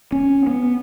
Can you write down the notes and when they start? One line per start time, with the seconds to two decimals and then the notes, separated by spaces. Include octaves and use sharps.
0.12 C#4
0.47 B3